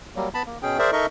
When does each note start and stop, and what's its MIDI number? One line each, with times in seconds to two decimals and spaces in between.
0.16 0.28 54
0.16 0.28 55
0.16 0.28 58
0.34 0.43 59
0.34 0.43 81
0.34 0.43 83
0.46 0.58 58
0.62 0.78 47
0.62 0.78 61
0.62 0.78 68
0.62 0.78 79
0.79 0.91 68
0.79 0.91 70
0.79 0.91 72
0.79 0.91 74
0.79 0.91 76
0.93 1.06 63
0.93 1.06 69
0.93 1.06 70
0.93 1.06 75
0.93 1.06 76
0.93 1.06 85